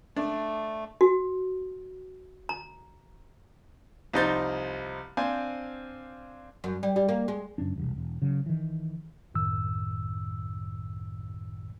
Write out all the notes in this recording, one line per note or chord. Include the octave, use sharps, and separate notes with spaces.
A3 D4
F#4
A#5
C2 F3 D#4 C5 G6 A6
C4 D4 C5 F5 G#5
F#2
G3
G3
A#3
G#3
F#1 F#2 C#4 D4
E1 C2
E1
C#3 F#3
D#3 E3
C2 F#2 A2 D#3 E6